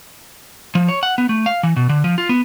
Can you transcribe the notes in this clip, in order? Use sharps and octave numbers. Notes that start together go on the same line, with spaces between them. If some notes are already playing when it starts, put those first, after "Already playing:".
F3
C#5
F#5
B3
A3
F5
E3
B2
D3
F3
F4
B3